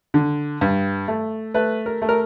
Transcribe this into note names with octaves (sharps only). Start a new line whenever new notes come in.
D3
G2
A3
A3 B4
A#4
A3
A#4